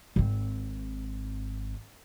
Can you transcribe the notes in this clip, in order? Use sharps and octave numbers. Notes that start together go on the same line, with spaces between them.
G#1 C4